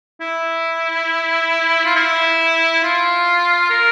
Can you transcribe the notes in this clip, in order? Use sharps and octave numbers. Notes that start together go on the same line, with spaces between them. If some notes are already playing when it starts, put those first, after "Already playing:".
E4
F4
E4
F4
A#4